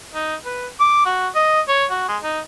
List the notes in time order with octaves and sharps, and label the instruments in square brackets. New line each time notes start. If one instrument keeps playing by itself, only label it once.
[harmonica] D#4
B4
D6
F#4
D#5
C#5
F#4
G#3
D#4